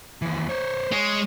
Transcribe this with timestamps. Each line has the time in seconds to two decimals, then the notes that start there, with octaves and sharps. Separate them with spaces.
0.22 D#2 E3
0.49 C5 C#5
0.92 G#3 C#5